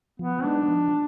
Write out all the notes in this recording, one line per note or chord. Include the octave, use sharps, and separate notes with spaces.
F3 B3
G#3 B3 D4 D#4
F3